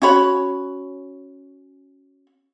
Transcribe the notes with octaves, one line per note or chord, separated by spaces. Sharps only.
C#4 F#4 C#5 B5